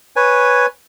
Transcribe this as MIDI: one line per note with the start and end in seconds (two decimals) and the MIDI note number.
0.16 0.66 71
0.16 0.66 73
0.16 0.66 80